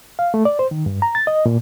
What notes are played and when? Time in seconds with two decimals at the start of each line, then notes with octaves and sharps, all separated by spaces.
0.19 F5
0.34 A3
0.45 D5
0.59 C5
0.71 D#3
0.86 G2
1.02 A#5
1.15 A6
1.27 D#5
1.46 A#2